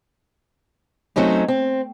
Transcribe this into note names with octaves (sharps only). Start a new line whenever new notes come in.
F#3 A3 C4 C#4 D#4
C4